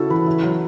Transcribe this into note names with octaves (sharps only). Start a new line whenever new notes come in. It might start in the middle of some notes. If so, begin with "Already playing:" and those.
Already playing: C#3 C#4 E4 F#4 A4
E3 B4
E4
F#3